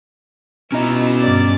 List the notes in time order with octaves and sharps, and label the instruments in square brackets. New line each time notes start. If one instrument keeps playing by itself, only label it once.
[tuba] B2 [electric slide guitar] C#4 D#5 [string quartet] E4 A#5 E6
[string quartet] G2 D5 A6